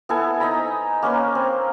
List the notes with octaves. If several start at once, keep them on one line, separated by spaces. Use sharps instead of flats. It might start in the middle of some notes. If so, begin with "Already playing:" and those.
B3 E4 A4 G#5
D#4 D#5 A#5 B5
A#3 C#4 A#4 B4
C4